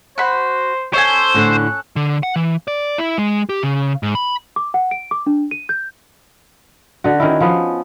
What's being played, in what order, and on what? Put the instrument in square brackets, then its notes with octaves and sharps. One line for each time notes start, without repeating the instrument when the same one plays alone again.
[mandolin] F#4 B5 [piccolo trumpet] C5
[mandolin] C#4 A4 G#5 [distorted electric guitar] C5
[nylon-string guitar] A2 D3 [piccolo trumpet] F#6
[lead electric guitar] D3
F#5
E3
D5
E4
G#3
G4
C#3
G#2
B5
[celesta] D6
F#5
D7
D6
D4
D#7
G6
[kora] D3 F#4
D#3 C#4 E4
F3 B3